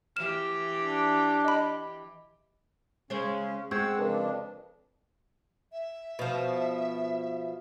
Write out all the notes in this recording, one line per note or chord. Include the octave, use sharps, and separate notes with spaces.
E3 G4 F6 E7
D4
D#5 B5
C#3 G#3 C#4 C5 C#5
G#3 C4 F#5 C#6 E6 G6 G#6
F2 C#3 D4 A#4 B4
E5
B2 F3